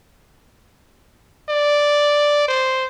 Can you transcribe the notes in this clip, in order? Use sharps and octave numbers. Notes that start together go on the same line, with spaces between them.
D5
C5